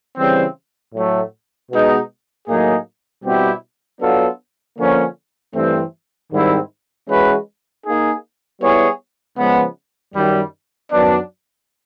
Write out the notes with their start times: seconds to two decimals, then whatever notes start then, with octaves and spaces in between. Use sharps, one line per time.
0.18 C#3 E3 G3 C4
0.94 A2 F#3 A3
1.71 B2 G#3 B3 D#4
2.48 A2 F#3 A#3 D#4 G#4
3.24 B2 G3 C4 E4 G4
4.01 F#3 B3 D4 F4 A4
4.78 D3 F3 A#3 C#4
5.54 G2 E3 A3 C4
6.31 G#2 D#3 G3 C4 E4
7.08 E3 G#3 C#4 F#4 B4
7.85 A#3 D#4 G#4
8.60 G3 B3 E4 G#4 C#5
9.37 C#3 F3 G#3 B3
10.14 F#2 D#3 G3
10.91 F#2 D#3 F#3 B3 D4